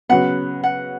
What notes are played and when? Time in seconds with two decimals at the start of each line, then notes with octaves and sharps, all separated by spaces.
0.09 C#3 F#3 B3 F#5
0.64 F#5